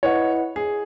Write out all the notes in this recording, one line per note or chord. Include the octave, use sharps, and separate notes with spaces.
E4 B4 C#5 D#5 F#5
G#4